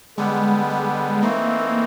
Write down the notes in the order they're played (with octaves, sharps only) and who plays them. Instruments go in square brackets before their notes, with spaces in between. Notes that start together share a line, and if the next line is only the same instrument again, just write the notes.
[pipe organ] D3 G3 B3 [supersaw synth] G#3
[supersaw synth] G#3
[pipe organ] E3 A3 C4 D#4 [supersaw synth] A#3